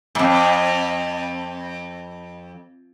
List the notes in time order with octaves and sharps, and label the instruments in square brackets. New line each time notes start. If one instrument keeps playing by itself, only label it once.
[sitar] F2 G#2